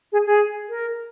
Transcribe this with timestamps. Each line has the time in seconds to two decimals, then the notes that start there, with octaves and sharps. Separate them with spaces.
0.12 G#4
0.26 G#4
0.69 A#4